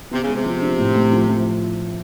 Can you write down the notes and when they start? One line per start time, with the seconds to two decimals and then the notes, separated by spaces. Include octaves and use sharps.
0.11 C3 B3
0.23 C#3
0.28 G#3
0.35 C3
0.45 F3
0.62 D4
0.79 A2
0.96 A3
1.12 F3
1.28 F3